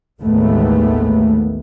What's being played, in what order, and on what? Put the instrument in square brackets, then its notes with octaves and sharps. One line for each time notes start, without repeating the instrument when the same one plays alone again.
[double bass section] A1 D#2 G#3 A3 B3